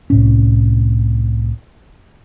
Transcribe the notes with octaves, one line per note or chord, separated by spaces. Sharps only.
C2 A2 C#4